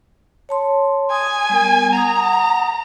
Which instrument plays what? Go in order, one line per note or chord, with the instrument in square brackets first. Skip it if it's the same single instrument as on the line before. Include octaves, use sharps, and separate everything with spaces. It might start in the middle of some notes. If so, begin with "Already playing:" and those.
[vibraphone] C#5 A5 C6
[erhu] G#5 [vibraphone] D#6
[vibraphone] G3 B3 A#4
[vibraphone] F#5 G#5 D#6 [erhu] A#5